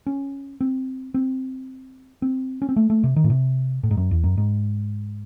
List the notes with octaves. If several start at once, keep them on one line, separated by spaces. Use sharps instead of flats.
C#4
C4
C4
C4
C#4
C4
A3
A3
C3
D#3
A2
C3
A2
G#2
F#2
E2
F#2
G#2